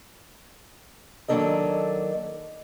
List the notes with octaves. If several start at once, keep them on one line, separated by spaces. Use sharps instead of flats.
D#3 F#3 A#3 D4 A4 D#5